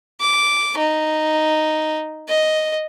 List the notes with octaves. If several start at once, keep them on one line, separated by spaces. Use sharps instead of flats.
D6
D#4
D#5